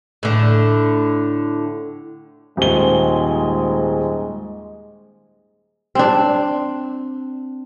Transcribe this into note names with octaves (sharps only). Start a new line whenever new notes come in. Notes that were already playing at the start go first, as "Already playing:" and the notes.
A2 D3
D#1 G#2 G#3 G7
C4 D4